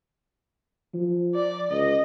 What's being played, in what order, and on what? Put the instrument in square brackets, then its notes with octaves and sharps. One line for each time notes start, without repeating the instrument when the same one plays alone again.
[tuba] F3
[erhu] D5
[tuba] C#2 [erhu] D#5